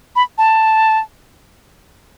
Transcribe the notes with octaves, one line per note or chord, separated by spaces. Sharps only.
B5
A5